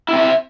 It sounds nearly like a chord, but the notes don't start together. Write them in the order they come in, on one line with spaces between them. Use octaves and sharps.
E4 C4 E5